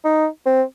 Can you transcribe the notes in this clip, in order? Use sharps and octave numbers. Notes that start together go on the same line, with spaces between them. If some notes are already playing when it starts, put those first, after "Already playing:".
D#4
C4